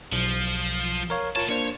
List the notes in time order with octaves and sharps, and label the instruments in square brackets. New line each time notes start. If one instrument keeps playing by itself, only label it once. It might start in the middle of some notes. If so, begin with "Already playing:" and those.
[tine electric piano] B1 [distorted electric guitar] F3
[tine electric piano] A#4 C#5 F5
[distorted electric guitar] A2 A5 [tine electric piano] F4 A#4 C#5
[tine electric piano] A#3 D4 C5 [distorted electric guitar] C#5